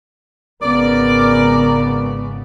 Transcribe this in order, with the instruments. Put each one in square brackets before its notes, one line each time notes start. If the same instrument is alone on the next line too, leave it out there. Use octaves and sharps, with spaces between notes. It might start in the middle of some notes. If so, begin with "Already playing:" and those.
[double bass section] G#1 C#3 B3 [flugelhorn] A#4 [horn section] D5